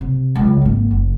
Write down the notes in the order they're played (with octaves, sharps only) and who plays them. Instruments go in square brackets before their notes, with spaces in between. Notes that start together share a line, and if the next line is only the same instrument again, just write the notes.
[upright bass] C3
C#2 F#3
G#1 A#3
F#1